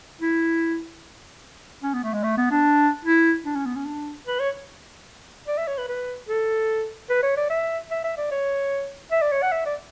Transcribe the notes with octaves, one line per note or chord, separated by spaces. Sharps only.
E4
C#4
B3
A3
G#3
A3
B3
D4
E4
D4
C#4
B3
C#4
D4
B4
C#5
D5
E5
C#5
B4
B4
A4
B4
C#5
D5
E5
E5
E5
D5
C#5
E5
D5
C#5
F#5
E5
D5